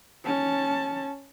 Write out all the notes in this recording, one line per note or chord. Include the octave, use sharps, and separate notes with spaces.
C#4 A5